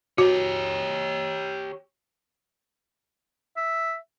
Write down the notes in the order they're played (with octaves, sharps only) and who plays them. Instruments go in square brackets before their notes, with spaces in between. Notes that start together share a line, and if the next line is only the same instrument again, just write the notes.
[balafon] F#4 [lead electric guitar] G4 C#5
[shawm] E5